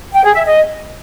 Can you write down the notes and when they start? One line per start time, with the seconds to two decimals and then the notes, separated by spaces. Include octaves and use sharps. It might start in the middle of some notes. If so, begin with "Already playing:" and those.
0.13 G5
0.24 G#4
0.35 E5
0.46 D#5